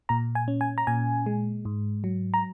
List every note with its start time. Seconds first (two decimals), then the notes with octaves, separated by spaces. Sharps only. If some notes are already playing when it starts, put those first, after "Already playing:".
0.09 A#2 A#5
0.35 G#5
0.48 C#4
0.61 G#5
0.78 A#5
0.87 A#2 G#5
1.26 G#3
1.65 G#2
2.04 F#3
2.34 A#5